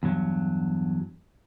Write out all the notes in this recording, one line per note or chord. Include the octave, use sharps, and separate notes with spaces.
E2 G2 F#3